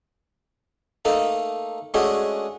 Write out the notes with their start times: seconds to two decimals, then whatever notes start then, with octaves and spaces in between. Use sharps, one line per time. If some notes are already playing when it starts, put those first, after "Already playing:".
1.05 A3 A#3 D#4 A4
1.94 G#3 A3 C#4 D4 F#4 G#4